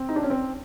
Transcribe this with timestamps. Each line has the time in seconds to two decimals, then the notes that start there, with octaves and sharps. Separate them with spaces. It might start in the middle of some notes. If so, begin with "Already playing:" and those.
Already playing: C4
0.09 D#4
0.16 D4
0.23 C#4
0.30 C4